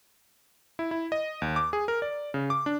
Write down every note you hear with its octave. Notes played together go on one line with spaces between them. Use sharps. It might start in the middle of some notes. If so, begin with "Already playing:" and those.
E4
E4
D#5
D#2
D6
G#4
A#4
D5
C#3
D6
D4